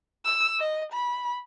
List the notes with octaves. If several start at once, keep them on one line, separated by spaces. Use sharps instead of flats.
E6
D#5
B5